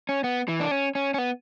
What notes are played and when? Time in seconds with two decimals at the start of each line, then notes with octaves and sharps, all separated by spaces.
0.09 C#4
0.24 B3
0.48 E3
0.60 D4
0.71 C#4
0.95 C#4
1.14 C#4
1.18 B3